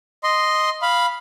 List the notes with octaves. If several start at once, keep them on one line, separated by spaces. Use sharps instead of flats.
D#5 C6
F5 B5